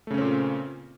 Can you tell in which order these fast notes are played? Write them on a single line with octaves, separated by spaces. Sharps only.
A3 C#3 C#4 C4 A#2